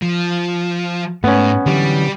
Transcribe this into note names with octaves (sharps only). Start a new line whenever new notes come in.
F3
G#2 A3 B3 C#4
D3 E3 F#3 G3